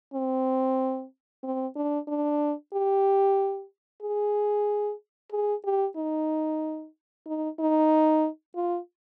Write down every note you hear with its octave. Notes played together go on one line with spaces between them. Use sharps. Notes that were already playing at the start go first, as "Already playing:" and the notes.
C4
C4
D4
D4
G4
G#4
G#4
G4
D#4
D#4
D#4
F4